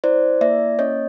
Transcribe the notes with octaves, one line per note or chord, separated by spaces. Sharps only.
E4 C5 D5
A#3 D5 E5
C#4 C#5 D#5